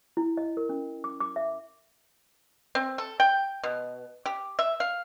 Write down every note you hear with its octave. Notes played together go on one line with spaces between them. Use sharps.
E4
D#5
A#4
C#4
D6
D6
E5
C4
A4
G5
B2
G4
E5
F5